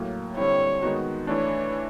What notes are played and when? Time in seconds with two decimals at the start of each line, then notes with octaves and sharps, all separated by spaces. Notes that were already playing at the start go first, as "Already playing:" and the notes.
Already playing: A2 F#3 A#3
0.37 D3 G3 C4 E4 C#5
0.82 D#3 G#3 B3 D#4 F#4
1.27 E3 A3 D4 C#5